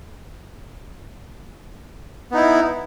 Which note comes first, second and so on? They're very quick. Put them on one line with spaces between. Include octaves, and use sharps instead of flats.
B3 D#4 E4